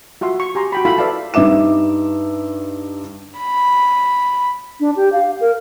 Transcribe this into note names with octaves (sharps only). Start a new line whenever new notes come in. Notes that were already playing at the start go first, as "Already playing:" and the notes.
F4 F#4 E5 C6
C#6
G4 G#5 A#5 C6
F#4 G5 B5
E4 F4 A4 F5 B5
A4 B4 D5 E5 F5 A5
G2 D#4 E5 D6 E7
B5
D4
G4
F5
A#4